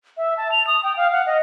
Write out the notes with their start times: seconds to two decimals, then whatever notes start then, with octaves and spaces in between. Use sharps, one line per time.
0.17 E5
0.37 A5
0.52 F7
0.67 D#6
0.83 G5
0.97 F5
1.12 F#5
1.26 D#5